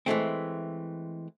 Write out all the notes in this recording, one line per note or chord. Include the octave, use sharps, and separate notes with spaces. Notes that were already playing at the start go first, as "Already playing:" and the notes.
E3 G#3 A3 C4